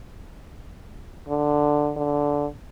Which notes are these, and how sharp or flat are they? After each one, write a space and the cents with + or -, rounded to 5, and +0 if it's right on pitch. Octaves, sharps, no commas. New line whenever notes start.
D3 +5
D3 -10